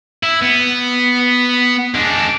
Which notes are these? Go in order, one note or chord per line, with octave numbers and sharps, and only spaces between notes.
E4
B3
G#3 D4